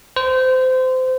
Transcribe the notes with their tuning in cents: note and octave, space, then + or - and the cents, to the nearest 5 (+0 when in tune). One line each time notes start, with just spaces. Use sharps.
C5 -25